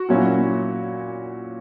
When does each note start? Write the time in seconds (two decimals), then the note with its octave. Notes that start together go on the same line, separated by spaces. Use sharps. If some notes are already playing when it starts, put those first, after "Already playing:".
Already playing: F#4
0.09 A#2 F#3 C#4 E4